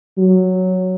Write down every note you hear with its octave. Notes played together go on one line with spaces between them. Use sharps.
F#3